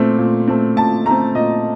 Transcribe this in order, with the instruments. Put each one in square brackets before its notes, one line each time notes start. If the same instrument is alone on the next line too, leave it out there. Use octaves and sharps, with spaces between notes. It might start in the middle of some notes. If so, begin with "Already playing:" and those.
Already playing: [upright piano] A#2 A3 C4
A#2
A3 C4
A#2 A5
A3 A#5
C4
A#2 D#5